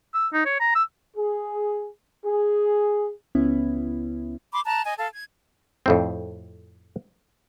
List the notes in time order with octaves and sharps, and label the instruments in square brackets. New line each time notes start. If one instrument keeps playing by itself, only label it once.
[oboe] E6
D#4
C#5
A#5
E6
[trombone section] G#4
G#4
[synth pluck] C#2 B3 C#4 E4
[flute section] B5 C6 D6
A5 A#5 F#6
D#5 G#5
A4 F5
G#6
[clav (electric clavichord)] F2 A2 C4